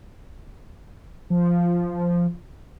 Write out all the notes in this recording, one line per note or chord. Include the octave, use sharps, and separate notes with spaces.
F3